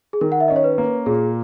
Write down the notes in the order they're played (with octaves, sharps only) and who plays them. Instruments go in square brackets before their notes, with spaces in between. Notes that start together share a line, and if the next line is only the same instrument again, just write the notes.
[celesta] G#4
[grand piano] D#3 [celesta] A#4
[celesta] F#5
E5
[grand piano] C#4 [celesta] D#5
[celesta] C#5
B4
[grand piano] A#3
[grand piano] A#2 [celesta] G#4